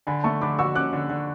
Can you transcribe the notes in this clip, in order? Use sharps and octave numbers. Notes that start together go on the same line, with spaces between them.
D3 G#5 B5
A3 A5 C#6
D3 B5 D6
F#4 C#6 E6
C#4 D6 F#6
D3
D3